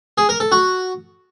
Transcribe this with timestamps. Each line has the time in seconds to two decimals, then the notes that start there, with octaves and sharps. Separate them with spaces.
0.18 G#4
0.29 A#4
0.40 A4
0.52 F#4